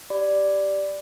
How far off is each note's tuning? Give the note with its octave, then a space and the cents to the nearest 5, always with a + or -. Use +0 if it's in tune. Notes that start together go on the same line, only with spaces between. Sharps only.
G4 +0 D5 +0 B5 +20